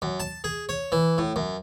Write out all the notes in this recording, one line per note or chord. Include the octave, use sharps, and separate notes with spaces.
F#2
A5
G#4
C#5
E3
A2
F#2